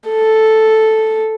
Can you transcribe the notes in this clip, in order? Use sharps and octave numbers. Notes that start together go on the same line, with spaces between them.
A4